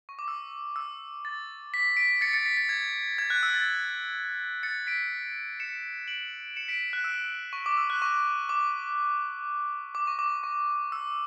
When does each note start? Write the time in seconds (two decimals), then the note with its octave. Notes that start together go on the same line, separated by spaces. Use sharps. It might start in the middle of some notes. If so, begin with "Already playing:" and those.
0.09 C#6
0.19 D6
0.28 E6
0.76 E6
1.25 A6
1.74 B6
1.97 B6 D7
2.21 A6 C#7
2.33 A6 C#7
2.46 B6
2.57 A6
2.69 G#6
3.18 G#6
3.30 F#6
3.43 E6
3.54 A6
4.63 A6 C#7
4.87 B6 D7
5.60 C#7 E7
6.08 D7 F#7
6.56 C#7 E7
6.68 B6 D7
6.93 F#6
7.04 E6
7.53 C#6
7.66 D6
7.77 E6
7.90 F#6
8.02 C#6
8.49 D6
9.95 D6
10.07 C#6
10.19 D6
10.44 C#6
10.92 E6